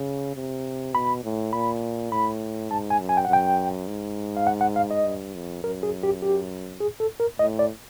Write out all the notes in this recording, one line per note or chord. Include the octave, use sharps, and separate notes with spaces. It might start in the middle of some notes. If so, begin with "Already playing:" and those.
Already playing: C#3
C3
B2 B5
A2
A#2 B5
A2 B5
G#2 A5
G#5
F#2
G#5
G5
F#5
F#2 G5
G#2
F5
F#5
F#5
F5
D#5
G2
F2
F#2 A#4
G#4
G4
G4
G#4
A4
A#4
A2 D#5
D5